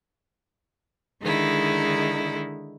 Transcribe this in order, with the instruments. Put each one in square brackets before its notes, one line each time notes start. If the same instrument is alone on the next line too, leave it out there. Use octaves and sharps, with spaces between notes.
[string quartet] D3 D#3 G#3 D#4 E4